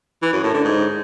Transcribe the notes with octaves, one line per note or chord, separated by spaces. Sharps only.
E3
F#2
A2
D3
G#2